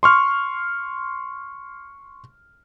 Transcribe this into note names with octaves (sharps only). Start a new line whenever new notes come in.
C6 C#6 F6